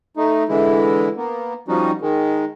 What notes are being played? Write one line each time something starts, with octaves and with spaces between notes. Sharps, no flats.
A3 D#4
D3 E3 G#3 E4
A#3 B3
F3 G3 C#4 D#4 F#4
D#3 G#3